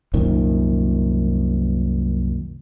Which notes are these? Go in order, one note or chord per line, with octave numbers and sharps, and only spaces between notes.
C2 F#2 A#2 D#3